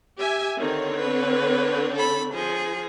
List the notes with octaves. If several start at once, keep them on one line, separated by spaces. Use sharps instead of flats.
G4 E5 G#5
D3 D#3 C4 C#5
B4
A4 B5
F3 G#4